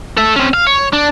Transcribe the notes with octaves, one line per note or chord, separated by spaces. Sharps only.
A4 E5
C4 C#4
F5
C#5
D4